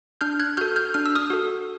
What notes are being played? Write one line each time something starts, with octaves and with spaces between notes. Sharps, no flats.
D4 F6 G6
F#6 G#6
F#4 A4 F6 G6
F6 G6
D4 F6
E6
D#6 F6
F#4 A4